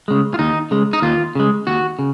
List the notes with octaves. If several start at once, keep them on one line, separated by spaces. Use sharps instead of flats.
C#3 G#3
F4
D#2 D#4
C#3 G#3
D#4
D#2 F4
C#3 G#3
D#2 F#4
C#3